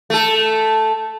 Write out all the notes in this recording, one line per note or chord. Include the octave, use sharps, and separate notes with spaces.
A3 A4